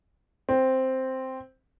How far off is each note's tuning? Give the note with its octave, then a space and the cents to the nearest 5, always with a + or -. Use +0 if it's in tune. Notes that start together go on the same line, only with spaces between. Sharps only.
C4 +0